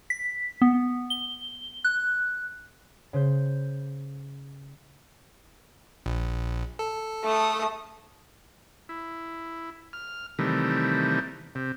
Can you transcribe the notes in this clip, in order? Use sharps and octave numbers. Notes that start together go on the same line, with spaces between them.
B6
B3
G7
F#6
C#3 C5 G6
A#1
A4
A3 D#6
E4
F6
C3 D#3 E3 G3 A3
C3